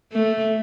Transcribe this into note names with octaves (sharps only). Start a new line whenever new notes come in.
A3